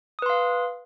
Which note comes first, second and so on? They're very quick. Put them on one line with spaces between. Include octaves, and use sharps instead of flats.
D#6 B4 C6 F5